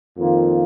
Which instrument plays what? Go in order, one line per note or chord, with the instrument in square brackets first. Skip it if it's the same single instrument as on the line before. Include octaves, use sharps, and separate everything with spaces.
[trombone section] F2 D#3 A#3 F4